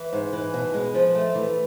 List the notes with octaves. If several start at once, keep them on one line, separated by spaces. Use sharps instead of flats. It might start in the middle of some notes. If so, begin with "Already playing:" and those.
Already playing: E3
G#2
E3
B2
G#3
F3
A3
E3